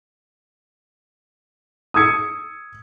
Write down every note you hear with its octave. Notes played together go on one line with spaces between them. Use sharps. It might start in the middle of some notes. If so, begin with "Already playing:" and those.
D#6 E6 G#6 C#7